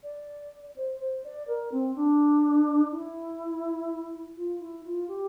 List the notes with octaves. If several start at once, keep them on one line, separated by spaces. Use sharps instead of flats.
D5
C5
C5
D5
A#4
C4
D4
E4
F4
E4
F4
G4